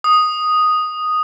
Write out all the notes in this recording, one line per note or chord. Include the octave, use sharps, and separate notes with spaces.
D#6